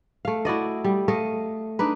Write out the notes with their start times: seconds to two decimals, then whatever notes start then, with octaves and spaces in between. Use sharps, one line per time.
0.25 A3 F5
0.45 E4 F#4 D5 D#5
0.84 G3
1.08 A3 D#5 F5
1.79 D4 D#4 B4